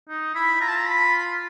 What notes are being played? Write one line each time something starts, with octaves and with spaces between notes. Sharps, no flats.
D#4
E4 B5
F4 A#5
A5
A#5
B5